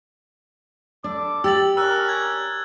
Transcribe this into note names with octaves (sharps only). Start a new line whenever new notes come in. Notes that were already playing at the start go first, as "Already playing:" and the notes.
G3 D4 A4 D6
G4 E6 A6 F#7
C#4 D4 A#4 E6 F#6
G#6